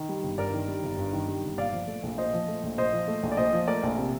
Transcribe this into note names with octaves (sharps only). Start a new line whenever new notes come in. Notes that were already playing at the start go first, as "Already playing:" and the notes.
Already playing: D#3
G3
G1
G2 A#4 D5
D#3
G3
G1
G2
D#3
G3
G1
A#2 D5 F5
F3
A3
A#1
A#2 C5 D#5
F3
A3
A#1
A#2 C5 D#5
F3
A3
A#1
D5
A#2 C5 D#5
F3
A3 A#4 D5
A#1
C3